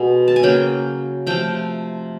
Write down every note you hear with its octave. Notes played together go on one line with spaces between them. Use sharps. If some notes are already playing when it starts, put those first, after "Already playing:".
Already playing: B2 G#3 B3
A5
G#5
C#3 F#3 A#3 G5
C3 F3 A3 G5